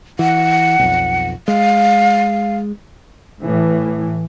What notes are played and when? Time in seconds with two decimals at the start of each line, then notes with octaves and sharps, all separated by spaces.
0.19 E3 F#5
0.79 B1 F2
1.48 G#3 F5
3.42 A2 E3